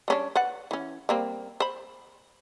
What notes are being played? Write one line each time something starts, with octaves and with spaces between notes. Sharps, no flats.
G3 C#4 D4
B4 D5 F#5
E3 C#4
G3 A#3 C4
C5 B5